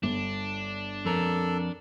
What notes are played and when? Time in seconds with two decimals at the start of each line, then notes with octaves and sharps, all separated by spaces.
0.03 G1 D4
1.05 F2 A4 A#4